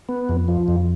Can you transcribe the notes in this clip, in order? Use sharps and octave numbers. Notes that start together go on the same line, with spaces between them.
B3
F2
F3
F2